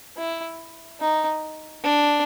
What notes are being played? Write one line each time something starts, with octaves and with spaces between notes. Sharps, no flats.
E4
D#4
D4